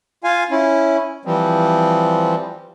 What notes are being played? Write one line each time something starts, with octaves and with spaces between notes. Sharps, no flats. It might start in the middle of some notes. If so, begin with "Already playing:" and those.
F4 F5 G#5
C#4 E4
E3 F3 G3 C4